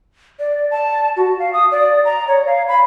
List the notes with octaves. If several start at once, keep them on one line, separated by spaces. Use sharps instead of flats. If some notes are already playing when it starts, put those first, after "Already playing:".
D5
A5
F#4
F5
D#6
D5
A#5
C#5
F5
B5